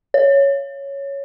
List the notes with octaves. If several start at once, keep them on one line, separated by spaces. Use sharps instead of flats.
C#5